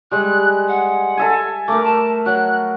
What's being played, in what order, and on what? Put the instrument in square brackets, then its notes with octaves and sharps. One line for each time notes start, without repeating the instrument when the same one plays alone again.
[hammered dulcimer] G3 G#3 [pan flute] F#6
[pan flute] F#5
[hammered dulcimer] A4 E5 G#5
[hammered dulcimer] A3 A#4 [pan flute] D6
[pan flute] A5
[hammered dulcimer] F#3 [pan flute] F#6